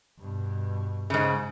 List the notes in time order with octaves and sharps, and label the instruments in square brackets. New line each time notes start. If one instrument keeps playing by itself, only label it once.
[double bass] G2 B2
[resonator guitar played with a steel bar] G#2 C#3